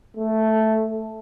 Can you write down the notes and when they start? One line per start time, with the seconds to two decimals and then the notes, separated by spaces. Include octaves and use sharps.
0.17 A3